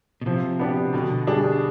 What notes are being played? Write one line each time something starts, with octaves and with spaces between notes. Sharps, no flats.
B2
C3 F3
B3 D4 G4
B2 D3
G3 D4 G#4